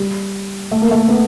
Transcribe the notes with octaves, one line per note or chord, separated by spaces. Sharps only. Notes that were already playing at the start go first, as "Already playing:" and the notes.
Already playing: G3
A3
A#3
A3
B3